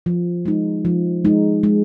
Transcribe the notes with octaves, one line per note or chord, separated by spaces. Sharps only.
F3
G#3 D#4
F3
G#3 D#4
G#3